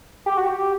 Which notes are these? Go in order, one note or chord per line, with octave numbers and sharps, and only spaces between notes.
G4
F#4
G4